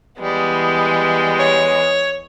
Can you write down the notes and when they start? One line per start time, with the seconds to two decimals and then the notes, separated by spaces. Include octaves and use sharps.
0.21 E3 G3 G#3 B3
1.39 C#5